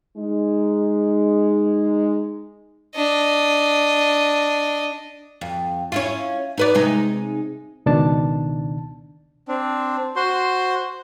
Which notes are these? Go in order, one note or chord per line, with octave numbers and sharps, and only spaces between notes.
G#3 D#4
D4 D#5
F2
C#4 E4 F4
D#4 B4 D5
C3 G#3 D#4
C#2 B2 D#3 D4 A5
C4 D4
F#4 C5 C6